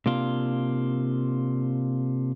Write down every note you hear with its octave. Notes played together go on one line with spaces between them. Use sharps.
C3 A#3 D4 F4